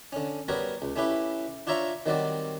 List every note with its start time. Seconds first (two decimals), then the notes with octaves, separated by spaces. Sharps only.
0.13 D3 C#4
0.48 G3 B3 F#4 A#4 C#5
0.82 C#2
0.96 A3 C#4 E4 G4 B4
1.67 D4 F4 C#5 E5 A#5 C#6
2.06 D#3 F#3 G3 C4 F#4 D5